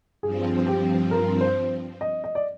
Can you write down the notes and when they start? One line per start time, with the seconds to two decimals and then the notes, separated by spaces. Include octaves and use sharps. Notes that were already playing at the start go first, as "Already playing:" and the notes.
0.22 G2 F3 C4 G#4
0.67 G4
1.11 A#4
1.41 C5
2.01 D#5
2.24 D#5
2.35 D5